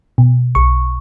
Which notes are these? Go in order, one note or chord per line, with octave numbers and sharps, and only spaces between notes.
B2
B1 C#6